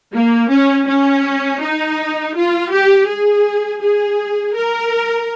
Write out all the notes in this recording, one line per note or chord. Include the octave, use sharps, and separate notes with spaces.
A#3
C#4
C#4
D#4
F4
G4
G#4
G#4
A#4